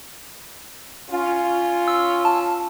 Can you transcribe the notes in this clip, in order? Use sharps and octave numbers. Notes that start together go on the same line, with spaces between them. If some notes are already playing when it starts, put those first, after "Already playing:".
C#4 F4
E6
A5